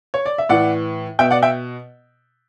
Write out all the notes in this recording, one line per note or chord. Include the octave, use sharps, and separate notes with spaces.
C#5
D5
E5
A2 E3 D5 F#5
B2 E5 G5
D5 F#5
E5 G5